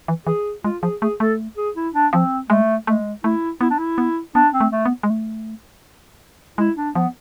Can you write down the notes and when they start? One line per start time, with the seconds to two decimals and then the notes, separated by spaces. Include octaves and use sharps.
0.08 E3
0.27 E3 G#4
0.64 G#3 F4
0.83 F3 G#4
1.01 A3 G#4
1.20 A3 A4
1.57 G#4
1.76 E4
1.94 D4
2.13 F3 C4
2.50 G#3 A3
2.87 G#3 A3
3.24 A3 E4
3.61 B3 E4
3.71 D4
3.79 E4
3.98 B3
4.35 B3 D4
4.54 C4
4.60 A3
4.72 A3
4.85 B3
5.03 G#3
5.10 A3
6.58 G#3 E4
6.77 D4
6.95 F3 B3